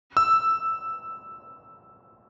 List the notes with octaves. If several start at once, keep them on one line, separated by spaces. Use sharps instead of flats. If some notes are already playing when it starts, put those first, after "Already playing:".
E6